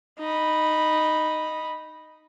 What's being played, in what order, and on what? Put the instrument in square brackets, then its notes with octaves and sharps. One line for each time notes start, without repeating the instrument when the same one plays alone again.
[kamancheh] D#4 B5